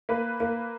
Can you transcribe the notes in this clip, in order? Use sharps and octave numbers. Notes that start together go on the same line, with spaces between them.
A#3 B4
A#3